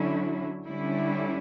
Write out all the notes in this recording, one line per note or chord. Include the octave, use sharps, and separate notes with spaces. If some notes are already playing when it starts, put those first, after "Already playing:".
Already playing: D3 F#3 C#4 E4
D3 G3 C#4 E4